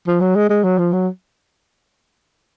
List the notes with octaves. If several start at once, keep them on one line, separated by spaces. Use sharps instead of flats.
F3
F#3
G#3
G#3
F#3
F3
F#3